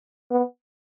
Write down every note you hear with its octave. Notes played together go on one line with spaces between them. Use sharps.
B3